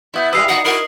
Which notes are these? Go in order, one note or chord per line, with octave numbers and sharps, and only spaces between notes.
B3 E4 E5 F#6 G6
G3 G#3 E4 G4 B4 F5 D#6 C7
A#2 F3 D#4 F#4 F#5
E4 F#4 A#4 F#7